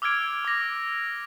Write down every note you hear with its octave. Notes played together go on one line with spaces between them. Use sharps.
D6 E6 F6 G#6 D7
D6 A#6